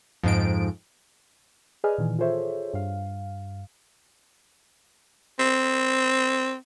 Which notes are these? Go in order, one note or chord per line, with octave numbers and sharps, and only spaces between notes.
F2 G#2 D7
G#4 B4 D5 D#5 G#5 F6
A#2 D#3 E3
F4 G#4 A4 C5 C#5 E5
G2 F5
C4